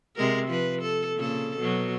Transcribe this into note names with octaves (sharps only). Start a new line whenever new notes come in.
C3 G#3 A#4
F3 B4
A4
A#2 C#3 A4
B2 F#3